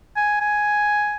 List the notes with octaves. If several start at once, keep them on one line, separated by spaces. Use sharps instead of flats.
G#5
G#5